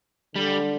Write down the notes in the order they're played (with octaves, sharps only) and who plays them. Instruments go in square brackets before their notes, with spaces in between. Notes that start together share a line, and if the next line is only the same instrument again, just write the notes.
[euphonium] D3 [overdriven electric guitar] G3